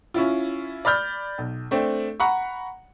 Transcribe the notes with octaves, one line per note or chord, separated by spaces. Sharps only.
C#4 E4 F4
D5 B5 F6 G6
B1
A3 C4 D4
F#5 A#5 B5 C#6